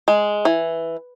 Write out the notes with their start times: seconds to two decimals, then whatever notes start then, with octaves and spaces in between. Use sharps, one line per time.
0.08 G#3
0.45 E3